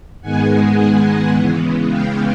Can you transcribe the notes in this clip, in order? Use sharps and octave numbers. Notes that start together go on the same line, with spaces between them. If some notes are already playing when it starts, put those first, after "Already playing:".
G#2 D#3 G#3 B3 F#5 G#5
C#3 E3 G#3 B3
F5 G5